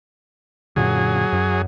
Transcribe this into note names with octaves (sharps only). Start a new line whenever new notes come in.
F#2 A#2 D3 F#3 G#4
F#2